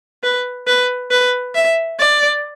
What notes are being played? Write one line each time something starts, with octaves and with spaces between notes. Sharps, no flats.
B4
B4
B4
E5
D5